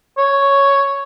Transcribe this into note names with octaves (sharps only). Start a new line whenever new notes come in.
C#5